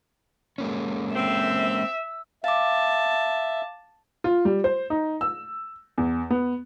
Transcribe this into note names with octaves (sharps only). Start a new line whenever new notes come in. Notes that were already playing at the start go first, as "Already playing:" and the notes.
G#3 A#3 C#4
C4 E5 E6
E5 F5 A5 D6
F4
G3
C5
D#4
E6
E2
B3